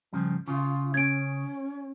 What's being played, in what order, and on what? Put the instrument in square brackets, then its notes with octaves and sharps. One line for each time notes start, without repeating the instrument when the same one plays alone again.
[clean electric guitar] G2 C#3 F3
[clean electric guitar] C#3 [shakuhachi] F4
[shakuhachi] C#4 [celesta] G#6 D7